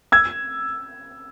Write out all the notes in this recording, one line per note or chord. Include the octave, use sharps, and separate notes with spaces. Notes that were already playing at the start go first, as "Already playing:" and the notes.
E6 G#6